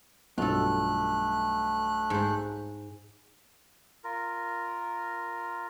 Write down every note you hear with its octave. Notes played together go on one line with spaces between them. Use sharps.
B1 G2 A3 F4 A4 F#6
G#2 C5
F4 A#4